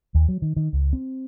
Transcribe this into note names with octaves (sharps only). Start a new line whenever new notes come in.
D#2
F#3
D#3
D#3
C#2
C4